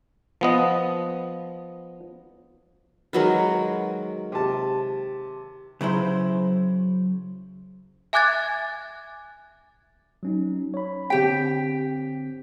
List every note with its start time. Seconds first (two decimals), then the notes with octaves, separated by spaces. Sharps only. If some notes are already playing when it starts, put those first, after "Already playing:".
0.41 F3 B3 D#5
3.13 D#3 F#3 G#3 A#4 B4
4.32 C3 A5
5.81 C#3 F#3 E4 C5
8.13 E5 G#5 D6 F#6 G#6 A6
10.23 F#3 C#4 D#4
10.74 C#5 B5
11.10 D3 C4 G4 G5 B6